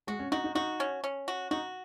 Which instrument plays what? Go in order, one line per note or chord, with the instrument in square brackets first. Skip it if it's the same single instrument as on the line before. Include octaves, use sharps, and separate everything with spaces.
[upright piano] G#3 [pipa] F#4
[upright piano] C#4
[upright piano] D#4 [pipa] F#4
[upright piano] D#4
[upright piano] D#4 [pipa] F#4
[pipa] C#4
C#4
F#4
[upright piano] D#4 [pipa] F#4